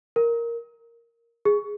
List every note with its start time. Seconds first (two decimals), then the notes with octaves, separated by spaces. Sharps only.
0.16 A#4
1.45 G#4